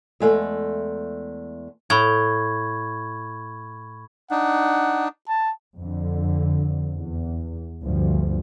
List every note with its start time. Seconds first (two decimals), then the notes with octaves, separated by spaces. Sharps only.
0.20 E2 G#3 A3
1.90 A2 B5 C#6 G#6
4.31 D4 D#4 F#5
5.28 A5
5.76 F2 D3
6.94 E2
7.84 D2 G2 F3